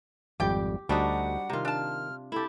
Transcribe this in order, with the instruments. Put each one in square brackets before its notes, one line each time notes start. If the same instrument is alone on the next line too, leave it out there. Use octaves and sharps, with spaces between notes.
[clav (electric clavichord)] G#1 F2 G3 [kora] G4 [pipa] D5 G5
[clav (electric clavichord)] D2 [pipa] C3 D#4 [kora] G3 D4 F#4 [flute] F#5
[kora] C3 F4 [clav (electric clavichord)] D#3 A#5
[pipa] D4 A5 [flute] F6
[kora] E4 G4 [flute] A4